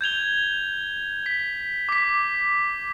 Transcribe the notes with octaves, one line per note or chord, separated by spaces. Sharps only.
G6 G#6 F7 G7
B6
D6 B6